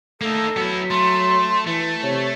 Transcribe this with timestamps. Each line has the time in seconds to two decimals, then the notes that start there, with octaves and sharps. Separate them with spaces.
0.21 A3 A#3 D#4 A4
0.57 F#3 B3 E4
0.91 A3 C6
1.67 E3 A3
2.03 C3 C#5